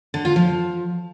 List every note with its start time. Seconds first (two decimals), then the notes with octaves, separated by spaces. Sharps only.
0.14 D3
0.25 F4
0.36 F3